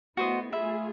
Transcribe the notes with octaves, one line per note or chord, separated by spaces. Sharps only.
A3 B3 E4 F#4 C5 D#5
A3 F4 G#4 E5 B5